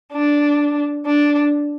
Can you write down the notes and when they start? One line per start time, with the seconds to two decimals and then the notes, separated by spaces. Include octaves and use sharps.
0.13 D4
1.06 D4